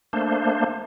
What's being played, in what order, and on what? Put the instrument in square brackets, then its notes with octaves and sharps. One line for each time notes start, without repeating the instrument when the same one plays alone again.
[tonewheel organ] A3 A#3 D4 C5